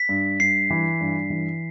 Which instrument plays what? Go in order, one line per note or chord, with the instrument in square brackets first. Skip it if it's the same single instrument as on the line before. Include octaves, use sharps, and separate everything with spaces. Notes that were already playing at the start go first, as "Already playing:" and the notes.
Already playing: [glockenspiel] B6
[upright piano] G2
[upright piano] G2 [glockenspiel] C7
[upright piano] E3
G2
E3